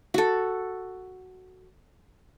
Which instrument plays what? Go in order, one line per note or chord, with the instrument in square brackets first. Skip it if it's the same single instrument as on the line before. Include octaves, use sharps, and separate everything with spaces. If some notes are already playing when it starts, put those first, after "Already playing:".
[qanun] F#4 A4